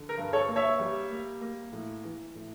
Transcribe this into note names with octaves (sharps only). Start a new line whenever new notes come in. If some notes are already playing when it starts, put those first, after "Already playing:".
Already playing: D3
A#4
G2
A4 C#5
A#3
C#5 E5
G3
A#3
A#3
A2
E3
A2